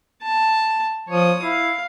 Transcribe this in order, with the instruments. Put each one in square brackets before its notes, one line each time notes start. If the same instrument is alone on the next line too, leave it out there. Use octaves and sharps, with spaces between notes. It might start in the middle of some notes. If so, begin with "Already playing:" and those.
[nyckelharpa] A5
[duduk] F3 [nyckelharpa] C#5 D#6
[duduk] E4 [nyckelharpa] F5